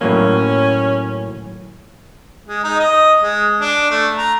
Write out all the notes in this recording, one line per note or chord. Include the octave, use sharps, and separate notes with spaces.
A2 F#3 A#3 C#4
G#3
D#4
D#5
G#3
D4
A3
A#5